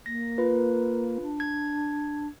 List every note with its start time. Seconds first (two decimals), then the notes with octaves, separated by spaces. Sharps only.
0.06 A#3 A#6
0.38 F4 B4
1.22 D4
1.40 G#6